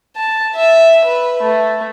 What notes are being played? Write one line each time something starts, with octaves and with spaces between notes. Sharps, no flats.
A5
E5
B4
A3